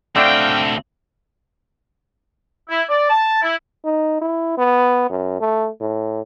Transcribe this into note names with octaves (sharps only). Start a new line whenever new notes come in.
D2 D3 A3 C4 D4 F5 G5
E4
D5
A5
E4
D#4
E4
B3
F#2
A3
A2